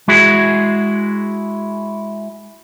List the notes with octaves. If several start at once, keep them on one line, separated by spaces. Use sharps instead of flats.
G#3 E4 F#4 G#4